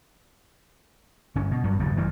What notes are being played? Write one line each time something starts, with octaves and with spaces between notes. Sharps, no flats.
G1 C#4
B2
G2 F#3
F#1 E2 G2
A1 G2 E3